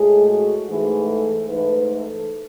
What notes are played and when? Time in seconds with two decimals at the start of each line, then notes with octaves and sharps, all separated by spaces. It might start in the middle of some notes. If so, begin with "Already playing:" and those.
Already playing: A2 G#3 G#4
0.28 F#4
0.68 G#2 E3 A3 G#4
1.08 A4
1.47 G#2 E3 A3 B4
1.87 A4